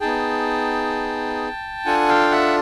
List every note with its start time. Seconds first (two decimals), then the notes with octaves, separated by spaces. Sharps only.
0.01 B3 D#4 G#4 G5 A5
1.86 D4 F4 A4 F#5 G#5
2.08 F5 G5
2.31 E5 F#5